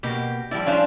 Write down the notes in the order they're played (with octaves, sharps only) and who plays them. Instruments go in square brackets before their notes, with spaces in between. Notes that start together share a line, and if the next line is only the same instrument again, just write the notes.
[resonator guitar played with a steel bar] B2 A#3 [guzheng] G4
[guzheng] F3 D5 [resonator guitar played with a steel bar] G3 E4
[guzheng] C#4 D4 C5 [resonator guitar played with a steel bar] F5